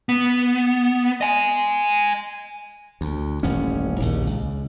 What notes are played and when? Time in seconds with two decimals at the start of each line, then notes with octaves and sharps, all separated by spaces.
0.09 B3
1.21 D#5 G#5
3.01 D2
3.43 D#1 A1 F#2 C#4
4.00 A#1 D#2 C#3
4.27 C#2